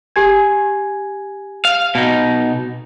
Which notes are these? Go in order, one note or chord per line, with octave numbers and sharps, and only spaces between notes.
G4 G#5 G#6
F5
B2 D#4